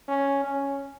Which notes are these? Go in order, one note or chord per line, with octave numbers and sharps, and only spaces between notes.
C#4
C#4